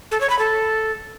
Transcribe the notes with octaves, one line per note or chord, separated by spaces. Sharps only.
A4
C#5
B5
A4